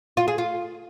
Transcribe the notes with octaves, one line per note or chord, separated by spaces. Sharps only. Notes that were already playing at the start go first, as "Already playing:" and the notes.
F4
G#4
F4